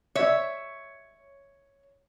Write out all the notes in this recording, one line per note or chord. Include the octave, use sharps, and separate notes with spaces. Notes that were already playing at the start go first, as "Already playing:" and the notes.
C#5 E5